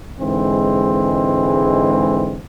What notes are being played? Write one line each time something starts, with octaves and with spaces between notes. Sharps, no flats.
G#2 D3 E3 G#3 C4